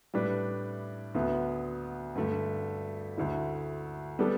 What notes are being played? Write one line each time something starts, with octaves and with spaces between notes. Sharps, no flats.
A2 G3 D4 B4
D2 D3 B3
G2 D3 A3
D2 D3 A3 E4
G3 B3 D4 A4